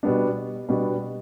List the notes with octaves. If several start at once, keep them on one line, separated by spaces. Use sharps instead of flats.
B2 G3 B3 D4
B2 G3 B3 D4